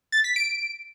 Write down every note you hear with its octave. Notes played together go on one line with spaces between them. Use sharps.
A6
B6
D7